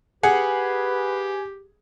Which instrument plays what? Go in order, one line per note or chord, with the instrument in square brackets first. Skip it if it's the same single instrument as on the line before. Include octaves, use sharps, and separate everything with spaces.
[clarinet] G4 [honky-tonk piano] G#4 [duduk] B4 [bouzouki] F#5